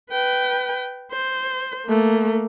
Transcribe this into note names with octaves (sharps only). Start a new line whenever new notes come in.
B4 G5
C5
A3 A#3